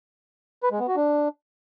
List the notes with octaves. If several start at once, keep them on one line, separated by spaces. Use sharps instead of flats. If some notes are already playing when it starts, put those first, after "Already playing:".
B4
G#3
B3
F#4
D4